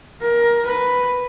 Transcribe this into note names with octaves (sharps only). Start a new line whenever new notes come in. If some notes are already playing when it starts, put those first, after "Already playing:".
A#4
B4